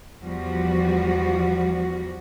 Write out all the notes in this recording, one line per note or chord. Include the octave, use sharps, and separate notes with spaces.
E2 F3 G3 F#4